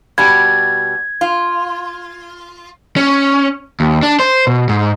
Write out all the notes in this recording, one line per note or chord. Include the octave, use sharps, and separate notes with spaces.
B2 G3 G#6
F4
C#4
D#2
D4
C5
B2
G#2